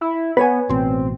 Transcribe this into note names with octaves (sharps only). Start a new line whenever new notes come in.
E4
B3 B4 C#5 G#5
A1 B2 C4